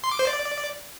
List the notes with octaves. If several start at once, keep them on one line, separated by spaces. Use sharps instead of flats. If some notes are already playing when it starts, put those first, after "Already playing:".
C6
D6
C5
D5